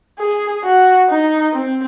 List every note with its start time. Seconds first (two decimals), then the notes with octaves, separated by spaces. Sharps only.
0.19 G#4
0.63 F#4
1.09 D#4
1.53 C4